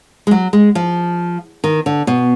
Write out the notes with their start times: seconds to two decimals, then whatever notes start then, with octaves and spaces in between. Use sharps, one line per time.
0.27 G#3
0.31 F#3
0.53 G#3
0.75 F3
1.64 D#3
1.86 D3
2.07 B2